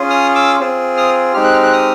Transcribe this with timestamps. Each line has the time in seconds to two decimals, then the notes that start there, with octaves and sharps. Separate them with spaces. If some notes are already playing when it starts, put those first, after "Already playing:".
Already playing: C#4 F4 G#4
0.10 D#6 F6
0.35 D6 E6
0.60 C4 F4 G#4
0.97 D#6 F6
1.34 G#3 C4 D#4 G4 F6
1.44 F#6
1.53 F6
1.63 F#6
1.73 D#6 F6